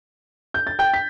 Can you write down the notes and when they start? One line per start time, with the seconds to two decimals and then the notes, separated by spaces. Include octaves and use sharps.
0.54 G6
0.67 A6
0.79 G5 G6
0.94 B6